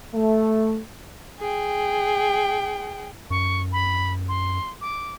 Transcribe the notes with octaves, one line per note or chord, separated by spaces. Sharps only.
A3
G#4 G5
F#2 C#6
B5
C6
D6